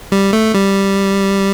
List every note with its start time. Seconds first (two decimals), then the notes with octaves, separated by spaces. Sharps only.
0.12 G3
0.33 A3
0.54 G3